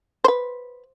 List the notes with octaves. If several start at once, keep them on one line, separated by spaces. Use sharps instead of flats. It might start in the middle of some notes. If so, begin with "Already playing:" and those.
B4 C5